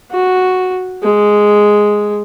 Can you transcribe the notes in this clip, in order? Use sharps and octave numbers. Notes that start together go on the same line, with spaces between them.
F#4
G#3